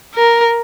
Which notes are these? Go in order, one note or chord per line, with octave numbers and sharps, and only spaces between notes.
A#4